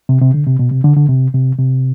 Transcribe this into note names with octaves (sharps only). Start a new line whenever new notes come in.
C3
C3
D3
C3
B2
C3
D3
D3
C3
C3
C3